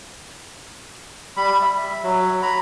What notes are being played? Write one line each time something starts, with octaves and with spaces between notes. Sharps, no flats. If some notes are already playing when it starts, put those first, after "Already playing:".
G3 B5
E5
F#3
A#5 B5